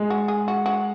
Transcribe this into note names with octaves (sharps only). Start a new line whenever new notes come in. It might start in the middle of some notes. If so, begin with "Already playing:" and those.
Already playing: G#3
F#4
G#4
F#4
F#4